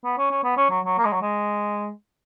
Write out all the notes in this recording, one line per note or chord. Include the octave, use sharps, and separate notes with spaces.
B3
C#4
C#4
B3
C#4
F#3
F#3
A#3
G#3
F#3
G#3